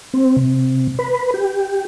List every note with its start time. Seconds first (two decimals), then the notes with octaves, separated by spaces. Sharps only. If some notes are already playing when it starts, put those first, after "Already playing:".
0.14 C4
0.36 C3
0.99 B4
1.34 G4